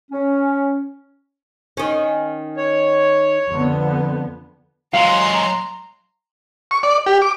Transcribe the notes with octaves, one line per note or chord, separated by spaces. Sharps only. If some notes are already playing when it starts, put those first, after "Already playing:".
C#4
D#3 C#4
C#5
F2 D3 B3
F#3 G#3 F5 A#5 C6
C#6
D5
G4
D6